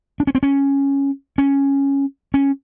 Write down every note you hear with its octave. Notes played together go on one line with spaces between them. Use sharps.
D4
C#4
C4
C#4
C#4
C#4